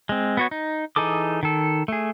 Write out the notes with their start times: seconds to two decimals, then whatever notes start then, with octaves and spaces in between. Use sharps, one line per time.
0.09 G#3 C4
0.37 B3 F#4 C#5
0.51 D#4
0.96 E3 D#4 G#4 A4 D6
1.43 D#3 A4
1.88 A3 G#4